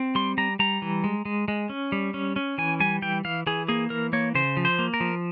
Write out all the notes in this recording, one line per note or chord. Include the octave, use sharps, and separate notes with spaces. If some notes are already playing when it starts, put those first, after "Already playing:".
Already playing: C4
G3 C6
G3 A#5
G3 A#5
E3
G#3
G#3
G#3
C#4
G3
C#4
C#4
E3 G#5
G3 G#5
E3 G5
E3 F5
E3 G#4
A#3 G#4
E3 A#4
A#3 C#5
C#3 C5
F3
C5
A#3
A#4
F3